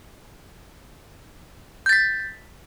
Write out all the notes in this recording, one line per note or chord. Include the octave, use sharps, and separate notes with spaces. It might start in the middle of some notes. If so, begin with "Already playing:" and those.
G6 A6 B6